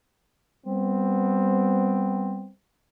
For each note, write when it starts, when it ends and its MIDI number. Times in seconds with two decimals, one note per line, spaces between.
0.67 2.48 55
0.67 2.48 59
0.67 2.48 60